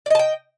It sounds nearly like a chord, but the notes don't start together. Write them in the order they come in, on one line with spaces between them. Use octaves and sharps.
D5 D#5 A5 G5